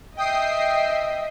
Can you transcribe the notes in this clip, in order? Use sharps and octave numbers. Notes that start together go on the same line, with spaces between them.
D#5 E5 G5 D#6 C7